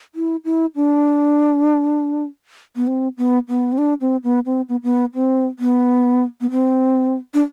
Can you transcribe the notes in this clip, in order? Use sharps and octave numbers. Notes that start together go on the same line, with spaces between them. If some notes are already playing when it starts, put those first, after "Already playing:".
E4
E4
D4
B3
C4
B3
B3
C4
D4
C4
B3
C4
B3
B3
C4
B3
B3
C4
D4